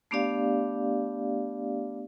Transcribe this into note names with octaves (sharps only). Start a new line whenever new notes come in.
A3 B3 D4 G4 D5 F5